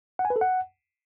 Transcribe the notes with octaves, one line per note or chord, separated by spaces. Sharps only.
F#5
G#5
B4
A4
F#5